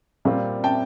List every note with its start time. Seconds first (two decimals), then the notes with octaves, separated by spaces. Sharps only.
0.25 A#2 G3 C4 F4
0.64 G5 A5